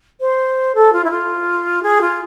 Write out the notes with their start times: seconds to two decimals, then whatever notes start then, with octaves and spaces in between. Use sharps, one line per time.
0.20 C5
0.75 A4
0.93 F4
1.04 E4
1.10 F4
1.83 G#4
2.01 F4